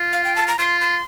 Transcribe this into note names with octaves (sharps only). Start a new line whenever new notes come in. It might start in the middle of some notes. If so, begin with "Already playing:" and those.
Already playing: F4
F5
G5
A5
A#5
F4 C6
C6